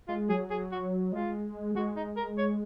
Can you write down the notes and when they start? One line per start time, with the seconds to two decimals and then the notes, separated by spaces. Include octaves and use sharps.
0.08 G#3 F4
0.29 F#3 G#4
0.50 G#4
0.72 F#4
1.12 G#3 F4
1.75 G#3 F#4
1.96 D#4
2.17 A#4
2.38 C#5